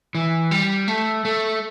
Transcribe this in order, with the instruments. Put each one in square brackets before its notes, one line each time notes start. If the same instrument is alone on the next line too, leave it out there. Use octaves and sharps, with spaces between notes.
[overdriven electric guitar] E3
G3
A3
A3